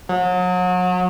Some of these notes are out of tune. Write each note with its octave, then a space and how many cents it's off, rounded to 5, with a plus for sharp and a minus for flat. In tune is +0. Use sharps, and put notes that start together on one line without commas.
F#3 -35